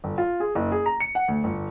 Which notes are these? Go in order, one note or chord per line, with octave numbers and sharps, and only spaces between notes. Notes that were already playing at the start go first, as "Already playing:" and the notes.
G1
F4
G#4
F#1
G#4
A#5
C#7
F#5
D2
G1